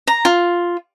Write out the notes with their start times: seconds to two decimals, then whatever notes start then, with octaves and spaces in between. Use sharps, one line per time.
0.07 A#5
0.25 F4